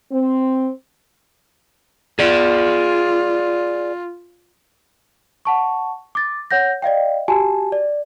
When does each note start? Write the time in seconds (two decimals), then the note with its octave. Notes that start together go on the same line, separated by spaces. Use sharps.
0.12 C4
2.19 F4 G#4 D5
5.45 F#5 A5 C#6
6.15 D6 A6
6.51 C#5 F#5 G6 A#6
6.82 D5 D#5 F5 G5
7.28 F#4 G4 G#5 A5
7.72 D5